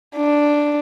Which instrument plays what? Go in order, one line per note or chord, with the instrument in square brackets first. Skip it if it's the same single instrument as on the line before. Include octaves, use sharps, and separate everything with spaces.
[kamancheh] D4